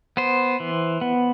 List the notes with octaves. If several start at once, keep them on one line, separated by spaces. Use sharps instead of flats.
B3 C5
E3
B3